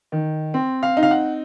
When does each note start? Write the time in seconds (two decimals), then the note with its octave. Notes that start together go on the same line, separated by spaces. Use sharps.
0.12 D#3
0.54 C4
0.83 F5
0.97 D#4
1.03 F5
1.11 F#5